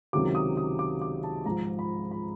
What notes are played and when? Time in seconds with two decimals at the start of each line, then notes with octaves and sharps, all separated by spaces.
0.13 C#2 C3 D#3 F#3 D6
0.35 D#6
0.57 D#6
0.79 D6
1.01 D6
1.24 A5
1.46 G#2 F3 A#5
1.79 B5
2.11 B5